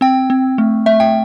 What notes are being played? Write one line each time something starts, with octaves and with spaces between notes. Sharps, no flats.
C4 G5
C4
A3
A3 E5
G5